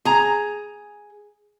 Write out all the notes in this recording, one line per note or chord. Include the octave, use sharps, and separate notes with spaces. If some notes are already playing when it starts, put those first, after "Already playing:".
G#4 A#5